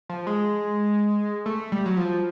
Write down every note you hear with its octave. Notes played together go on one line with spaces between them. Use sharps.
F3
G#3
A3
G3
F#3
F3